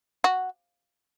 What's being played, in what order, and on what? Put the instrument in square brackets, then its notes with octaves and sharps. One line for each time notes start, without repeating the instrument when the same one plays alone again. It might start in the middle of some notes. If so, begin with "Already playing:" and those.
[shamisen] F#4